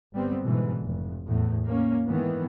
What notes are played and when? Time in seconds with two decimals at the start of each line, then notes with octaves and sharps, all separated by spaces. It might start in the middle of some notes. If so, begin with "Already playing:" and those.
0.14 G1 G3 B3 C4
0.44 G#2 B2 D3 E3
0.83 F1
1.27 E2 A2
1.67 A#3 C#4
2.07 G#2 D#3 E3 B3